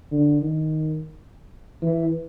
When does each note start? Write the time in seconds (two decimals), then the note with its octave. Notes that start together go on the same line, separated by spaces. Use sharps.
0.12 D3
0.41 D#3
1.82 E3